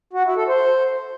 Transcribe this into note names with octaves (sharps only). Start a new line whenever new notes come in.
F#4
E4
A4
C5